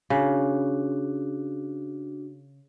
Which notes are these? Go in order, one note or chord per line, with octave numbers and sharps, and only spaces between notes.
C#3 D4 F#4